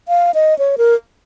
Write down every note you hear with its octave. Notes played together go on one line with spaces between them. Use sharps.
F5
D#5
C#5
A#4